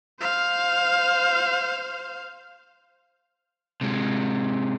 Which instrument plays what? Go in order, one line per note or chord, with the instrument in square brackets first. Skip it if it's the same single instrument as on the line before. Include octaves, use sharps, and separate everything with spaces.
[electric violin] C5 F5
[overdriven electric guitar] C3 G#3